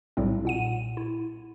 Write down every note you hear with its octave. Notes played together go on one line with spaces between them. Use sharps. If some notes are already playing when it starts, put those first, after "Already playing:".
B1 A2 G3 C4
A#2 F#5 D#7
E4